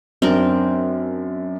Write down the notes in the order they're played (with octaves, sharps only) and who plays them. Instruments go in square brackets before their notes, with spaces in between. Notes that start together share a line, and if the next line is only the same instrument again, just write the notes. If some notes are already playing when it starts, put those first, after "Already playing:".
[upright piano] F#2 D4 [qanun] C4 A#4